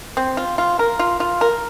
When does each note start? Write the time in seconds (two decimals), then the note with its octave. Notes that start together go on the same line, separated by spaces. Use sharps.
0.17 C4
0.37 F4
0.58 F4
0.79 A#4
0.99 F4
1.20 F4
1.41 A#4